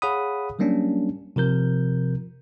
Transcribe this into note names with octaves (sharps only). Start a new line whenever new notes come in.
G#4 C#5 F5 F#5 B5 D#6
F#3 G3 A#3 C#4 D4
C3 F3 A#4 G6